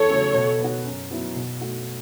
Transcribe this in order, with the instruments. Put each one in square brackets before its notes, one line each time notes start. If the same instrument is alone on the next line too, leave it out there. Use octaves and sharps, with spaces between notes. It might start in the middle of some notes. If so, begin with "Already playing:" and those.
Already playing: [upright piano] E2 [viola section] A4 C#5
[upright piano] C#3 F#3 A3 C#4
B2
B3 F#4
F#2
F#3 B3 E4
B2
A3 F#4